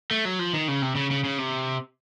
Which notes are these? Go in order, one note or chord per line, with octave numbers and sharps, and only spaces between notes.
A3
F#3
F3
D#3
C#3
C3
C#3
C#3
C#3
C3